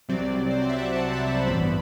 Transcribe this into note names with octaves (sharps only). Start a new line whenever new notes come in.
C2 C3 F#3 C4 D5
C5
D5
E5
F#5
A5
B5
B5
A1 G2 E3 B3 B5